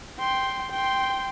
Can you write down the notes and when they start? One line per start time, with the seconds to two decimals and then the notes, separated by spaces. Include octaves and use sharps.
0.19 G5 C6
0.71 G5 C6